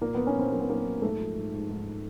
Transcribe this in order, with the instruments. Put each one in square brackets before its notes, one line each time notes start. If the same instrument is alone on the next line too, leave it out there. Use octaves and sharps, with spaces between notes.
[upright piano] A#2 A#3
A#2 B3
C#4
A#2 C4
F#3 A#3
B3
F#3 A#3
F#3
G#2 A3
F3
G#2
G#2
G#2